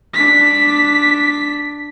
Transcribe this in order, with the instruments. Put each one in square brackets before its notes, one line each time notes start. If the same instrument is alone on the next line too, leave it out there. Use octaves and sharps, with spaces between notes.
[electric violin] D4 B6